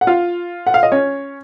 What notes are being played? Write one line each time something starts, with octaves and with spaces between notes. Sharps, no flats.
F#5
F4 F5
F#5
F5
D#5
C#4 C#5